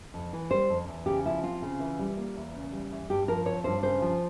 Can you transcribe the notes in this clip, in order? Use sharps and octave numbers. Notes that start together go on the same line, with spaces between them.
F2
E3
G3 C5
F2
E2
C#3 G4
F3 E4
C4 F4
C#3
E3
G3
A#3
E2
C#3
G3
E2
G2 G4
F3 A#4
C4 C#5
G2 C5
C#3 C5
F3